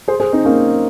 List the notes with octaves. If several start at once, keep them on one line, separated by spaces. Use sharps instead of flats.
G#4 C5
G#4 C5
C4 D#4
A#3 C#4